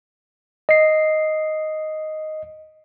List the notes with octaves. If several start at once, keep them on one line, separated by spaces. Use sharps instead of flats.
D#5 C7